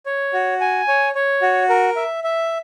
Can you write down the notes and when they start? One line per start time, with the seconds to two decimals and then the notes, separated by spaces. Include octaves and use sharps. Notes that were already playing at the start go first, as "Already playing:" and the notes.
0.06 C#5
0.33 F#4
0.61 G#5
0.88 C#5
1.15 C#5
1.42 F#4
1.69 A#4
1.96 E5
2.24 E5